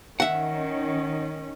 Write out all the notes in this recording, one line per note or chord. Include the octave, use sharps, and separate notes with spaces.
D#3 C#4 E5 F#5